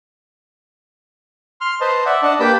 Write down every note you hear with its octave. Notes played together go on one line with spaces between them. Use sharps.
C6 F6
B4 C5 D#5 A5
D5 E5 F#5
D4 D#5 F#5 A5
A#3 G4 B4 G5 A5 B5